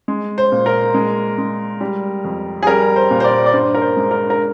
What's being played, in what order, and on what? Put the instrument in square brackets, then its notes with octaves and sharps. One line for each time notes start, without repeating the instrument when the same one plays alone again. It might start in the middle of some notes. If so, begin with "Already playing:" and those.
[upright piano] G#3
C5
A#2
A#4
G#3
G#3
G3
F2
G#4
G3 A#4
C5
A#2
C5
D5
D5
G2 C5
A#4
C5
G#3
A#4
A#4